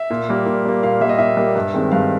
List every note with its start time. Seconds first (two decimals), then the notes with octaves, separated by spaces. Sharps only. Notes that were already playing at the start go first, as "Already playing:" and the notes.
Already playing: E5
0.10 A#2
0.29 G3 A#3
0.46 A#2
0.65 G3 A#3
0.83 A#2 F5
1.01 G3 A#3 E5
1.09 D#5
1.18 A#2 E5
1.37 G3 A#3
1.56 G2
1.74 D#3 G#3 C4
1.91 G2 F5